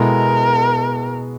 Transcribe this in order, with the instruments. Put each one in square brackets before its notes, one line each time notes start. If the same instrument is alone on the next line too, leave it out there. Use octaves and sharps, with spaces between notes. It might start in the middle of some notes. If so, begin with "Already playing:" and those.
Already playing: [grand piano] B2 G#3 B3 E4 A4 [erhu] A#4